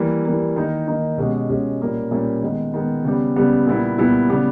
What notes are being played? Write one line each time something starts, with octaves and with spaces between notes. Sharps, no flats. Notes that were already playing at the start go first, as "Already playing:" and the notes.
Already playing: E3 G3 A#3
E3 G3 A#3
D#3 A#3 D#4
D#3 A#3 D#4
B2 G#3 C#4 G4
B2 G#3 C#4 G4
A#2 G3 A#3 C#4
A#2 G3 A#3 C#4
D#3 G#3 B3
D#3 G#3 B3
C#3 G3 B3 G4
C#3 G3 B3 G4
A#2 G3 B3 E4
A#2 G3 B3 E4
C#3 G3 B3 G4